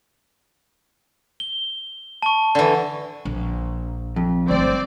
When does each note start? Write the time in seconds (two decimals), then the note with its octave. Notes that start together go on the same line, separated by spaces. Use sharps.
1.40 G7
2.22 A5 C#6
2.55 D3 E3
3.25 A#1
4.16 F2
4.48 G1 A3 C4 D5